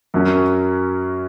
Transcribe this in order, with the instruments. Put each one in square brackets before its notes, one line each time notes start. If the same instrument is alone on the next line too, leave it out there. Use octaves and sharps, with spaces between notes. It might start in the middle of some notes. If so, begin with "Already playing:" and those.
[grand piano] F#2 F#3 C#4